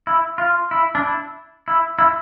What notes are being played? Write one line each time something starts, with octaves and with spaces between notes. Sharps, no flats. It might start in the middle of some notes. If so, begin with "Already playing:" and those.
E4
F4
E4
D4
E4
E4
E4